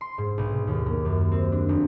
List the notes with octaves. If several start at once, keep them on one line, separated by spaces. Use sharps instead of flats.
C6
G#2
B1
D#2
A#3
F#2
C4
D4
F1